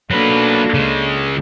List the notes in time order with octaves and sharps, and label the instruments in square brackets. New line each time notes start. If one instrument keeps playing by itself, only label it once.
[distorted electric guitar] F#3 B4 [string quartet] A#3 D4 A4
[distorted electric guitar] C#3 G#3